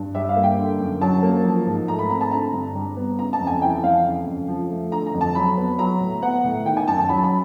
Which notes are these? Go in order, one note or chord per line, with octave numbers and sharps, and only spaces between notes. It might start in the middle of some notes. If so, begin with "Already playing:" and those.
Already playing: G2
G3 E5
F5
A#3
G5
D3
F#2
F#3 A5
A#3
F3
G#2
A3 A#5
B5
C4 A#5
A5
D3 A#5
G2
G3
B3
C#3 A#5
A5
F2
G#5
E3 G5
F2 F5
C#3
F2
F3
A3
D3 A#5
A#5
F2
A5
F#3 B5
B3
F#3 A#5
A2
B3 F#5
A2
D#3 G5
G#5
F#2 A5
A5
F#3 B5
B5